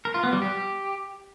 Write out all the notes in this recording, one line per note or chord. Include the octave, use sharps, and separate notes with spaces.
A#4
F4
B3
G3
G4